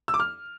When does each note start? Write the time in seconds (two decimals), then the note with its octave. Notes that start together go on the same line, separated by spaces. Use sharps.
0.08 E6
0.14 D6
0.20 F6